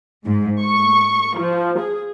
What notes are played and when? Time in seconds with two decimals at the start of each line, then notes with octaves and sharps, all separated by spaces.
0.25 G#2
0.60 C#6
1.38 F3
1.79 G#4